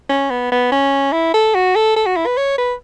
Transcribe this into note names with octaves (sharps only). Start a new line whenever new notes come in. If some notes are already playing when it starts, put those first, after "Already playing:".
C#4
B3
B3
C#4
E4
A4
F#4
A4
A4
F#4
E4
B4
C#5
B4